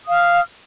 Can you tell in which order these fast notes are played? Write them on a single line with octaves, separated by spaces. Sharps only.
D#6 F5 F6